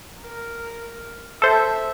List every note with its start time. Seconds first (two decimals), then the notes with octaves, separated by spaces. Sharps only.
0.22 A#4
1.42 A4 C5 E5